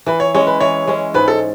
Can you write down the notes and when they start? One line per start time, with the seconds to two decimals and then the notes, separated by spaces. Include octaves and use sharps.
0.06 E3 B4
0.20 C#5
0.35 G#3 C#4 C#5
0.47 B4
0.60 E3 C#5
0.88 G#3 C#4
1.14 G#2 B4
1.28 A4